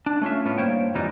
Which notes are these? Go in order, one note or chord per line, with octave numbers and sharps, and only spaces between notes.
D4
A3 C#4 F4 E5
A2 B3 C#4 F4
G2 G3 A#3 C5 C#5 G5
F2 A#2 E3 G3 D#4